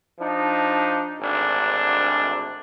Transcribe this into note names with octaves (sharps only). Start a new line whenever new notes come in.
F3 D4 D#4
G#1 D2 D4